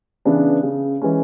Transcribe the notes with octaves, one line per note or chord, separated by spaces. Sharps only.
C#3 E3 B3 D4
C#3
E3 G#3 C#4